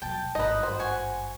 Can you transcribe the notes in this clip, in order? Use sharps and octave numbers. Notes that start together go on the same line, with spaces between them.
B2 F#3 G5 A5
G#1 G2 D#4 B4 D#5
C5
F#5 G#5 C#6